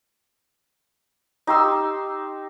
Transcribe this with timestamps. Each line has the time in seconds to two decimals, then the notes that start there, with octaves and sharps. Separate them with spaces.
1.47 D#4 G4 C6 E6